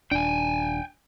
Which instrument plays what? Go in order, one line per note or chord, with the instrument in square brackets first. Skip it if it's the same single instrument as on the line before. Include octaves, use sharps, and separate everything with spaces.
[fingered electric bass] D#1 D4 [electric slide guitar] G5 G#5